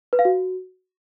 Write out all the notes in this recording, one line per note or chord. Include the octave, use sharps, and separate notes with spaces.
B4
F5
F#4